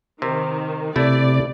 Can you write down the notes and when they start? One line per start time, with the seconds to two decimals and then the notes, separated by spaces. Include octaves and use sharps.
0.22 C3 D#3
0.96 C3 A3 E4 D5